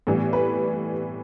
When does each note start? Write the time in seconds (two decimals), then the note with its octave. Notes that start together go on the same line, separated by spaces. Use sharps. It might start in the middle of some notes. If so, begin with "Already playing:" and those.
0.07 A2 E3 G3 B3
0.33 B4